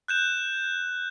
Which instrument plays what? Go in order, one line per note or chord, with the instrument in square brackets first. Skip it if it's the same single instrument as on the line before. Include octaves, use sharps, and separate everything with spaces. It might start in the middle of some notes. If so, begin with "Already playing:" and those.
[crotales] F#6 G6 E7